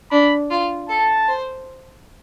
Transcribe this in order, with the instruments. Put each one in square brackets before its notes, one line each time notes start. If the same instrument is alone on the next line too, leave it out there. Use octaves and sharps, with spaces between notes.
[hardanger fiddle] D4 [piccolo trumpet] B5
[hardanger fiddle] F4
[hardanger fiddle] A4 [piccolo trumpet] A5
[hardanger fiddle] C5